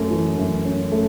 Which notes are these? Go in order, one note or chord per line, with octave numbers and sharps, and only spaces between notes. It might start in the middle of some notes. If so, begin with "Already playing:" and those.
Already playing: F#2 A3 C#4
E3
F#2
C#4
A3